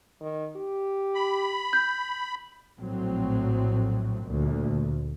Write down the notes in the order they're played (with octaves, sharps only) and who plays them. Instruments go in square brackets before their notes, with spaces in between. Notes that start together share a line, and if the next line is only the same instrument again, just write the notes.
[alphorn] D#3
G4
[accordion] B5
[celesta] G6
[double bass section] A#1 A2 F#3 C4
D2 A#2